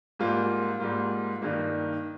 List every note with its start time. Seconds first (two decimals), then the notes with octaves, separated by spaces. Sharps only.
0.19 G#2 G3 A#3 F4
0.80 G#2 G3 A#3 F4
1.42 G2 D#3 A#3 D#4